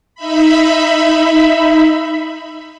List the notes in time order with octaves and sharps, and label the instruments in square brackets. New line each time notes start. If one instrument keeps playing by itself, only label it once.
[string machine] D#4 E5 B5